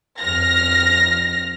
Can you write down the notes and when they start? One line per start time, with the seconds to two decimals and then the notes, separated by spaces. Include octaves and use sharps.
0.20 F2 F6 A#6